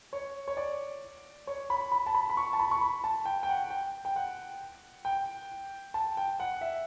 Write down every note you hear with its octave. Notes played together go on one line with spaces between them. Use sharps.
C#5
C#5
D5
C#5
B5
B5
A5
B5
B5
C#6
A5
B5
C#6
B5
A5
G5
G5
F#5
G5
G5
F#5
G5
A5
G5
F#5
E5